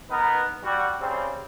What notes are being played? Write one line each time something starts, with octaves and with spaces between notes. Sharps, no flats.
B3 D#4 A#4 B4
G3 F#4
C#3 G3 C4